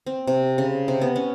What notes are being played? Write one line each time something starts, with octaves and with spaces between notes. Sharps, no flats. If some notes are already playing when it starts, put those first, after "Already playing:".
C4
C3
C#3
C3
B3
C#4